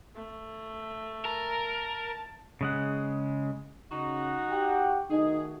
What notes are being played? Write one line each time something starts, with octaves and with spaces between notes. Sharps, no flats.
A3
A#4 A5
C#3 G#3 F#5
C#3 D#4 F#4
G4 F#5 G5
D#3 A3 D#4 F#4 G#4